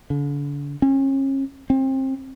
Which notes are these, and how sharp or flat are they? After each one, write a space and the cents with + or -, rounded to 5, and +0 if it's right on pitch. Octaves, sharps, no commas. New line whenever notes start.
D3 -40
C#4 -35
C4 +25